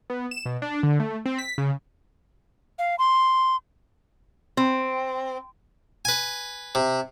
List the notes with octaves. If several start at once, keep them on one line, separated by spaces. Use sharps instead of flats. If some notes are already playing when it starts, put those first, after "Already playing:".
B3
E7
B2
D4
D3
A3
C4
B6
C#3
F5
C6
C4
B4 G#5
C3